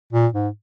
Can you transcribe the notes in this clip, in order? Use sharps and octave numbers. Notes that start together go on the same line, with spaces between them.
A#2
G#2